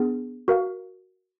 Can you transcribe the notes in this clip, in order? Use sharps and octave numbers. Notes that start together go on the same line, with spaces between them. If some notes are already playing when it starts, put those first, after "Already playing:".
Already playing: B3 D4 G#4
F#4 A#4 F5